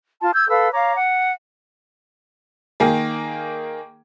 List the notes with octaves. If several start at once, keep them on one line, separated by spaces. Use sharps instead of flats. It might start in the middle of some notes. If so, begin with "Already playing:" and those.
F4 A5 C6
E6 G6 G#6
A4 B4 F5 E6
C#5 F5 A#5 D6
F#5
D#3 A#3 G#4